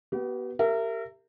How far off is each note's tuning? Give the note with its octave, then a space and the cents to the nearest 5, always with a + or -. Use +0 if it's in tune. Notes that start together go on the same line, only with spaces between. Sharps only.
B3 -15 G4 -45
G4 +5 A#4 -25 E5 +20